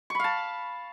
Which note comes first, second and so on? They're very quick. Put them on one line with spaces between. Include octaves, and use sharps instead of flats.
C#6 B5 F5 A5